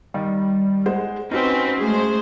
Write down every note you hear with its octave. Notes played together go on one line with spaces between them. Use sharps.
D#3 G3
G#3 C5 F#5
C4 C#4 D#4 F#4 B4
G#3 A3 G#4 C5